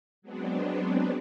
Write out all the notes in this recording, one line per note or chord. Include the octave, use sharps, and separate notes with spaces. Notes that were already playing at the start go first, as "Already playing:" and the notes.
F#3 G#3 B3 C4 D4